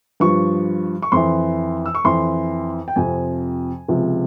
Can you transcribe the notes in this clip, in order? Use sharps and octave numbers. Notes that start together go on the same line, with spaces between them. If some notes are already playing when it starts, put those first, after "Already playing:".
G2 F3 C#6
C#6
F2 E3 C6
E6
C#6
F2 E3 C6
G5
F2 C3 F3 G#5
C#2 C3 F3